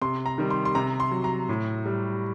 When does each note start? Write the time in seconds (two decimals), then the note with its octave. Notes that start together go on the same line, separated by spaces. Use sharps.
0.02 C3 C6
0.26 A#5
0.38 D#3 G3
0.50 C6
0.65 C6
0.75 C3 A#5
1.00 C6
1.11 F#3
1.24 A#5
1.49 A2
1.86 G3